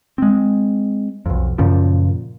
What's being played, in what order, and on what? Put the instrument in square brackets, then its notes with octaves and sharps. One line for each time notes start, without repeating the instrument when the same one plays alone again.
[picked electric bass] G#3 C4
B1 F2
F#2 A#2 C#3 F3